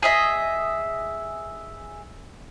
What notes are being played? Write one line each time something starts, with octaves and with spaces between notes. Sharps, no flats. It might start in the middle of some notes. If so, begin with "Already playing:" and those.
G#4 D#5 E5